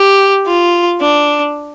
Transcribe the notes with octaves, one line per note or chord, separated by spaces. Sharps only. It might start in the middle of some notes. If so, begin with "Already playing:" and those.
Already playing: G4
F4
D4